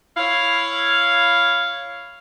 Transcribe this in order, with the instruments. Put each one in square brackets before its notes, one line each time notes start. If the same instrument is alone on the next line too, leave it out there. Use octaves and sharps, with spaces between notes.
[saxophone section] E4 C#5 F5